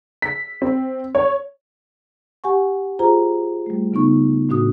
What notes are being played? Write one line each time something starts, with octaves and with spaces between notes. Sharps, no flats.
B6
C4
C#5
G4 F#5 G#5 C#6
F4 G#4 C5 A#5
G3 A3
C#3 B3 D#4 C#6
A2 D4 F#4 D#6